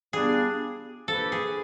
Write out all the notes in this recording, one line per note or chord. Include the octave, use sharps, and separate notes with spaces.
G3 B3 D4 F4 G#4
F3 A#3 D4 G4 A4 B4
G#4